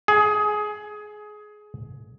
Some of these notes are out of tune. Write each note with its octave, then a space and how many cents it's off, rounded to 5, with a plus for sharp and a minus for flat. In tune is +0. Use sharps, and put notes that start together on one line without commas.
G#4 +20